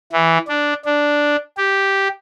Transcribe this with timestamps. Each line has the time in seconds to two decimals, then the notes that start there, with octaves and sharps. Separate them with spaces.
0.12 E3
0.48 D4
0.85 D4
1.58 G4